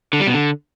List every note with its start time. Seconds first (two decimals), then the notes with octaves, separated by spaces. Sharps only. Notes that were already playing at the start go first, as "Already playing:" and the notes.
0.13 D3
0.20 G3
0.27 B2
0.34 D3